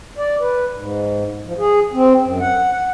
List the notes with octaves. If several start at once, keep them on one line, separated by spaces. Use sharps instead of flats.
D5
B4
G#2
F3
G#4
C4
F#2
F#5
F#5